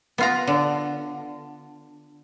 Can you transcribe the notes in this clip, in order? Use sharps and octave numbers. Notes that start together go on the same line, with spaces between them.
B3 F4 A#5
D3